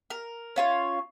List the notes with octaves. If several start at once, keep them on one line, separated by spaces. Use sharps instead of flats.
A#4
C#4 F4 C#5